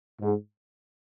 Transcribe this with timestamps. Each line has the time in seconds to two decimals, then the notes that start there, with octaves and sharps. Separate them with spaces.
0.22 G#2